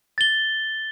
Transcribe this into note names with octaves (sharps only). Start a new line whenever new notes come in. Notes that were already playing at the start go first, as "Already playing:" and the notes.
A6 G7